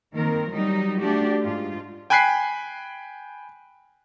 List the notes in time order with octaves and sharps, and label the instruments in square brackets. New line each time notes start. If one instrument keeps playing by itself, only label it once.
[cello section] D#3 A#3 C4 A#4
F#3 G3 D#4
A3 D4 F#4 G4
G#2 F4
[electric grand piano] G5 G#5 B5 F#6 B6 C7